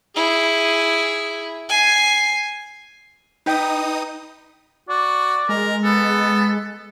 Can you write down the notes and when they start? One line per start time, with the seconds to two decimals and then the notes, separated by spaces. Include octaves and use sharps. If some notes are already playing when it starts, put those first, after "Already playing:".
0.16 E4 G#4
1.69 G#5 C7
3.46 D#4 B4 G5 D#6
4.89 F#4 D5
5.49 G#3 A#4
5.84 B3 A4